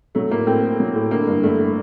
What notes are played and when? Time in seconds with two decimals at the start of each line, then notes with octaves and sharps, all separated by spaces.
0.15 F#3 A3
0.31 A2 A#3
0.47 A2 C4
0.63 A3
0.80 F#3
0.96 A2
1.11 D3 A#3
1.28 G2
1.43 G2 A3
1.59 A3